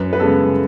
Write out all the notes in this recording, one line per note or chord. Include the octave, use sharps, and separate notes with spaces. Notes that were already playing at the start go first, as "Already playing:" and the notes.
Already playing: F#2 B4
B4
C#3 G#3 B3 A4